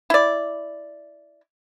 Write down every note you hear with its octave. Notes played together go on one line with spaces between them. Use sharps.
E4 D5